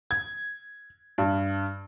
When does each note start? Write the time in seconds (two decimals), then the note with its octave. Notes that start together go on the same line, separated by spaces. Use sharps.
0.11 G#6
1.18 G2